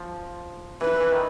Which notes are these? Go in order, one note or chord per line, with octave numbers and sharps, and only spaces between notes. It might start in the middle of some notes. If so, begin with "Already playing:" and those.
Already playing: F3
E3 B4
E3
D#3